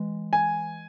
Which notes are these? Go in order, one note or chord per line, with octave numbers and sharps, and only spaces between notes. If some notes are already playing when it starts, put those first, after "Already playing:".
Already playing: E3 G#3
G#5